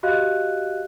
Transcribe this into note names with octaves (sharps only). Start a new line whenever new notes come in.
F#4 G4 D#5 F5 F#6